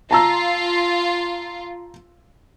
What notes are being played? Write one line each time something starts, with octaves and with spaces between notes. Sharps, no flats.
F4 A5 A#5 E6